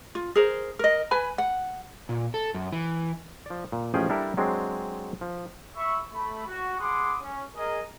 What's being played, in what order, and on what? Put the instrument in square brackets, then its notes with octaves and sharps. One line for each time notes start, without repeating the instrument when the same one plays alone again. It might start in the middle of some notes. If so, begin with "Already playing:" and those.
[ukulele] F4
G#4 A#4 C5
A#4 D#5
B4 G#5 B5
F#5
[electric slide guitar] A#2
A4
F#2
E3
[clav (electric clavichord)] F3 D5
A#2
A1 F3 C#4 G#4 G5
G3 D4 E4 A4 A#4 E5
F#3 G#3 C4 D4
F3
[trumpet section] E5 B5 C#6
A3 B5
F#4
G#4 F#5 B5 C6 D6 D#6
C#4
G#4 A#4 D#5